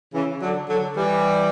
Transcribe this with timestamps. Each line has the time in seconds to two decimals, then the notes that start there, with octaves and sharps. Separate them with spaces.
0.13 C#3 E3
0.40 D3 F#3
0.68 D3 F#3
0.95 E3 G3